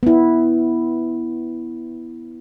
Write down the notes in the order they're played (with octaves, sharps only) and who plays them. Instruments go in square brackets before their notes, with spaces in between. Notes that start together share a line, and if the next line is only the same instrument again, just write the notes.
[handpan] B3 E4